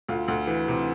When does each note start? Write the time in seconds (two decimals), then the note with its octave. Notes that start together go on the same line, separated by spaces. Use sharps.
0.09 D2 F4
0.28 D2
0.47 E3
0.68 C3